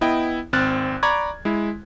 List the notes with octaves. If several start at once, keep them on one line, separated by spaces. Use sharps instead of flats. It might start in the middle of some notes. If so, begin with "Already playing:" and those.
B3 E4 D#5 G5
G#1 C4 F6 F#6 A6
D5 A#5 B5 C#6 D6 G#6
G#3 E4